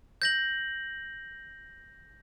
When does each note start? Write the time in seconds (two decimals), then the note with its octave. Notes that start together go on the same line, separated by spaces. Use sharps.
0.22 G6 A#6 F#7